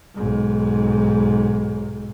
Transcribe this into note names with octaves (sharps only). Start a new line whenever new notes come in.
B1 G#2